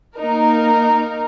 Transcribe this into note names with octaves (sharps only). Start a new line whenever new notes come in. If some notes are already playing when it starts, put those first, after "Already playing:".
A#3 D#4 A#4